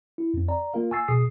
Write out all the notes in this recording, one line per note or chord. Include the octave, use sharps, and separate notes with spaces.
E4
F2 C4
D5 A#5
A#3 F4 A#4 F5
G#5 C#6 E6 A6 C7
B2 G#4 D#6 C7